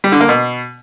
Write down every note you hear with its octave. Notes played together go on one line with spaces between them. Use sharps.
G3
D3
A#3
B2